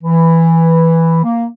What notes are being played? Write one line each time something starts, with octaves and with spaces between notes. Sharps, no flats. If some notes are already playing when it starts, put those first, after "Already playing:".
E3
A#3